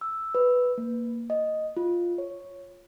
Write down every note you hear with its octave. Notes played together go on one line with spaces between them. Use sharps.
E6
B4
A#3
D#5
F4
C#5